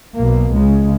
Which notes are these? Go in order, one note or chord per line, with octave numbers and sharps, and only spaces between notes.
B1 B2 A#3
C#2 C#3 G#3